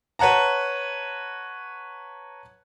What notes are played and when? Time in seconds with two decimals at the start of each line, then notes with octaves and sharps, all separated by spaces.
0.19 B4 C#5 F#5 A5 A#5